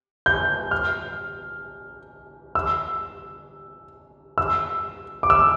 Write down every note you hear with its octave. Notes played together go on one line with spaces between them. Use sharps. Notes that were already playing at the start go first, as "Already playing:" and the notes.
G6
F6
E6
E6
D6
E6